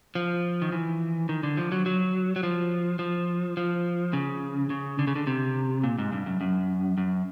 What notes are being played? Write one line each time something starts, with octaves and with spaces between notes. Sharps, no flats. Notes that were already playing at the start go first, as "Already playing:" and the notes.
F3
D#3
E3
D#3
D3
F3
F#3
F#3
F#3
F3
F3
F3
C#3
C#3
D3
C#3
D3
C3
A#2
G#2
G2
F#2
F#2
F#2